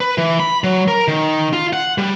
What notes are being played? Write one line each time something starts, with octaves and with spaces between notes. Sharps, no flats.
B4
E3
B5
F#3
A#4
D#3
F4
F#5
G3